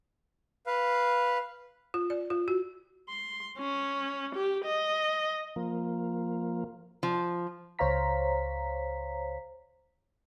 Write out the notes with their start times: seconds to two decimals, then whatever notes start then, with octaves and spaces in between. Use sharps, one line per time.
0.66 B4 F5
1.94 F4
2.10 D5
2.30 F4
2.48 F#4
3.09 C6
3.58 C#4
4.35 G4
4.65 D#5
5.56 F3 A#3
7.03 F3
7.79 C#2 C5 C#5 F5 A#5 B6